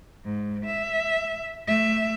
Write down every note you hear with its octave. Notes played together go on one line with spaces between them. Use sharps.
G#2
E5
A3 E5